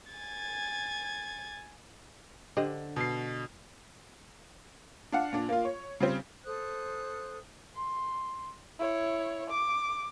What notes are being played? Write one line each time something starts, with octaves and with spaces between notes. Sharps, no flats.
G#5 G#6 A6
D3 G4 C5 D#5
B2 C7
D4 F5 F#5
A#2 D4
A#3 F4
C#5
C#3 G3 C4
A4 C5 D#6 F#6
C6
E4 C#5
D6